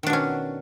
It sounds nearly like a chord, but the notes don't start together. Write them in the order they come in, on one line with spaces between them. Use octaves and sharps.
D#3 D4 B2 C#4